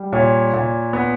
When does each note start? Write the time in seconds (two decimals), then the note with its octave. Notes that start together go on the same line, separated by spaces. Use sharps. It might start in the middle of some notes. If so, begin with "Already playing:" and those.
Already playing: G3
0.13 A#2 C#5
0.53 A#2
0.93 B3